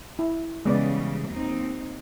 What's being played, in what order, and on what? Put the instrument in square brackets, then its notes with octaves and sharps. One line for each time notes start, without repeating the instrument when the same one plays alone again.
[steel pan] E4
[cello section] C#3 E3 G3 [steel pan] G#3 B3 D5
[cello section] D#2 C4 D#4